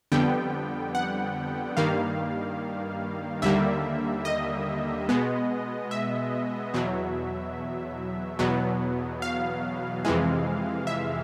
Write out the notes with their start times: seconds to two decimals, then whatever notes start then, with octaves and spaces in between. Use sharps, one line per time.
0.12 F2 D3 G3 B3 G5
0.95 F#5
1.77 G2 D#3 G3 A#3 F5
3.42 D#2 D3 G3 A#3 E5
4.25 D#5
5.09 B2 G#3 B3
5.91 E5
6.74 E2 B2 F#3
8.39 E2 B2 F#3 B3
9.22 F5
10.05 F2 C3 E3 G#3
10.87 E5